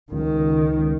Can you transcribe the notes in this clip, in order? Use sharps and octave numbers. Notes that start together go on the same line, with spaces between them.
C#2 D#3